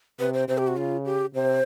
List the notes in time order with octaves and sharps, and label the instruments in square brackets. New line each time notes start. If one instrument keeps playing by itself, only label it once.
[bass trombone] C3 [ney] B4
[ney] C5
[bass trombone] C3 [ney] C5
[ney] G4
F#4
[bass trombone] C#3 [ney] F4
[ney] G4
[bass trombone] C3 [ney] C5